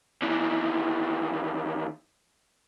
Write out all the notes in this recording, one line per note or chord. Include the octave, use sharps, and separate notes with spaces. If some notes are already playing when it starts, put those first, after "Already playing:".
D#2 E3